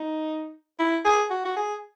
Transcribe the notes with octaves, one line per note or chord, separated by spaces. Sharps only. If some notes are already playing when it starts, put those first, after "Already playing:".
Already playing: D#4
E4
G#4
F#4
F#4
G#4